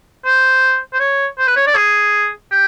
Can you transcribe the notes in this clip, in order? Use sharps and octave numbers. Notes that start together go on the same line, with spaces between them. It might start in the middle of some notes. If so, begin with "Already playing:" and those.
C5
C5
C#5
C5
B4
C#5
D5
G#4
G4